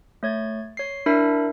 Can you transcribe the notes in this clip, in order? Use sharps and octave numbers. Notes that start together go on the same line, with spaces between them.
A3 C#5 G#6 A6
C#5 C7
D4 E4 A#4 E5 B5